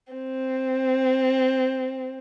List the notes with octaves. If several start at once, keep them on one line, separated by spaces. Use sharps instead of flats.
C4